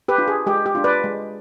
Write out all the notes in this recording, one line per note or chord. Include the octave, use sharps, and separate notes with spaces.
G4 B4
D4 F4
G#4
G#3 G4
G4
D4 F4
B4 D5
G#3